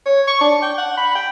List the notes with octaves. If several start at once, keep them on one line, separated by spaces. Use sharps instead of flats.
C#5
C#6
D4
G5
F#5
B5
G5